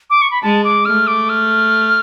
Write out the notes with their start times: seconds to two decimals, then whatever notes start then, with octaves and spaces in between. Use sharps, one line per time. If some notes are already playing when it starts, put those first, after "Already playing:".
0.10 D6
0.22 C#6
0.31 B5
0.42 G#3 A5
0.64 D6
0.85 A3 F6
1.07 D6
1.29 F6